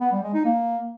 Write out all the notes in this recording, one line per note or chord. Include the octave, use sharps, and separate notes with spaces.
B3
G3
G#3
D#4
A#3